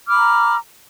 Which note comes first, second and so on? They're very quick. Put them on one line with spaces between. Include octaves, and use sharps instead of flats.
D6 F6 B5 A#5